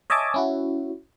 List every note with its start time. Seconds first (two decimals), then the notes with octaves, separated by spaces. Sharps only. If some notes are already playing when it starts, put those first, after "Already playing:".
0.10 C#5 D#5 E5 G#5 A5 D6
0.34 C#4 E4 F#4